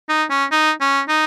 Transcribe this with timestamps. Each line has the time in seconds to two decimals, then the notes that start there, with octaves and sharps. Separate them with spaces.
0.09 D#4
0.30 C#4
0.51 D#4
0.81 C#4
1.08 D#4